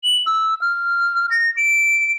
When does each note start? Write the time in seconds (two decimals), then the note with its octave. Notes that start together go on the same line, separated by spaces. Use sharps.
0.04 F#7
0.27 E6
0.61 F6
1.31 A#6
1.57 D7